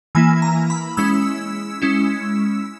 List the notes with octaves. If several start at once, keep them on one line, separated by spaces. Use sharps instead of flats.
E3 A#3 E4 G#5
A#5
B5
G#3 C#4 E4 E6
G#3 C#4 E4